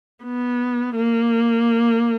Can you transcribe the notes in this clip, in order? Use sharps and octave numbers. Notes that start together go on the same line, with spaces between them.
B3
A#3